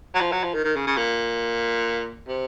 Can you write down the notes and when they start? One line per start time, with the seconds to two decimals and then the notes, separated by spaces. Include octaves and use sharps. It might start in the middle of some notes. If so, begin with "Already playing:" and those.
0.14 F#3
0.21 F3
0.32 F#3
0.44 F3
0.54 D#3
0.65 D#3
0.76 C#3
0.87 C#3
0.97 A#2
2.27 C3